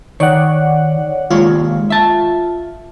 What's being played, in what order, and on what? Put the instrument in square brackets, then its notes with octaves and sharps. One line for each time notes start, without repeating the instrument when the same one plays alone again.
[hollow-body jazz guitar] D#3 [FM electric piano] C#5 D5 F#5
[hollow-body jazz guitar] D#2 G#3 C#5 [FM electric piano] F4
[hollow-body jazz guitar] E5 A5